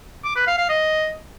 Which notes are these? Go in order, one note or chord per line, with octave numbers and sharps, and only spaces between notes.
D6
B4
F5
F5
D#5